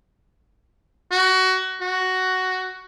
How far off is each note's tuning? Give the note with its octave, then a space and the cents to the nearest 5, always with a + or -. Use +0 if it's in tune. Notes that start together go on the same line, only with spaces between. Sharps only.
F#4 +20
F#4 +5